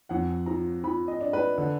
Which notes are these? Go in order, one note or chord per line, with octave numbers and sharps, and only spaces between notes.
F2 F#5
F3 A#5
F3 B5
D#5
D4
B4
D3